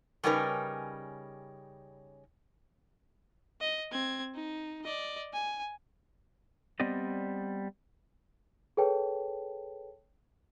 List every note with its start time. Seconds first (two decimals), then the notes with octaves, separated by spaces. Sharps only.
0.23 C#3 G3 C#4 D#4 A#4 B4
3.61 D#5
3.92 C4 G#6
4.35 D#4
4.84 D5 D#5
5.34 G#5
6.80 G3 B3 C4 D5 D#5
8.77 G#4 A4 B4 C#5 G5 A5